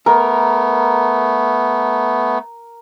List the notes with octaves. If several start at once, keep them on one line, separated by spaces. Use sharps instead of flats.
A3 B3 A#4